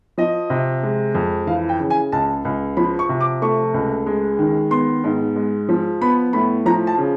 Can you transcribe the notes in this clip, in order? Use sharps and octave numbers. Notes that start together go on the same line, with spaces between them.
F3 D#5
C3
G#3
F2
E3 F5
G5
C#3
G#5
C#2 A5
C#2
F3 B5
C#6
C3
D6
A3 C#6
C#2
G#3
D#3
B3 C6
G#2
G#3
F3
B3 B5
A2 B5
F3 A#5
A5
C#3